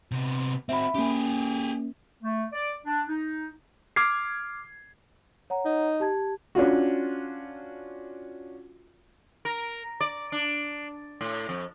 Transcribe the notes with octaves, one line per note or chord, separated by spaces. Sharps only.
C3 B3
C4 F#4 E5 B5
A#3 C#4 G4 G#4
A3
D5
D4
D#4
D6 F6 G#6 C7
C#5 F#5 A#5
D#4
G4 A5 G#6
C#4 D4 F4 F#4
A#4
D5
D4
A2
F2